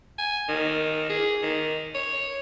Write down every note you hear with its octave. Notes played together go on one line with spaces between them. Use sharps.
G#5
D#3
G#4
D#3
C#5